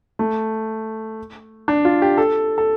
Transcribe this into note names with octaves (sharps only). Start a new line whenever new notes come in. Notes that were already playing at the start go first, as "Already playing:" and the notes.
A3
D4
F4
G4
A4
A4